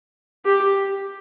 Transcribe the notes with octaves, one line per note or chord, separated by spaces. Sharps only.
G4